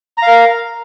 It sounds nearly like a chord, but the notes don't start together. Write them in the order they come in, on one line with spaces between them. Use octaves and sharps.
A#5 F5 A#4